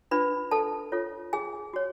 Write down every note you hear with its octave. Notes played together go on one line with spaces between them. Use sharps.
D4 F4 B4 B5
A4 A5
F4 A4 C#5
G#4 G#5
F#4 C#5